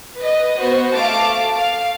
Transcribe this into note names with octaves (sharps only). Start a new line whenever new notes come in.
B4 D#5
B3 F#4 C5
A3 F5 A5 D6
F5